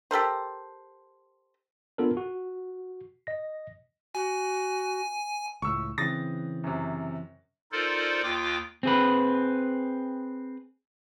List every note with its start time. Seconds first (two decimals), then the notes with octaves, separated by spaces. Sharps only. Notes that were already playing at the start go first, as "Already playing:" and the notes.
0.11 G4 A4 A#4 C5
1.98 B3 D4 F4 A4 A#4
2.17 F#4
3.27 D#5 A#6
4.15 F#4 G#5
5.62 C#2 A2 C#6 E6
5.98 C#3 E3 C4 D#6 A6 A#6
6.64 F#2 C3
7.72 D#4 F4 A4 A#4 C5 D5
8.23 D#2 F4 G5 D6
8.83 C4 G#4 B4